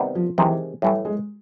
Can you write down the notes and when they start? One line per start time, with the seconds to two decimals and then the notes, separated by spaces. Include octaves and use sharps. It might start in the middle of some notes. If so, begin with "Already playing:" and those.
Already playing: C3 D#3 G3 B3
0.15 F3
0.38 C3 D#3 E3 G#3
0.82 A2 E3 G3 A3
1.05 G#3